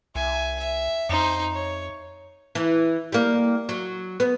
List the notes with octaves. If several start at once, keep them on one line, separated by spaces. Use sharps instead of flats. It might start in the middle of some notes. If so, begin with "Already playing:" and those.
C2 E5 G#5
E5
F2 D#4 C5
C#5
E3
G3 A#3
F#3
B3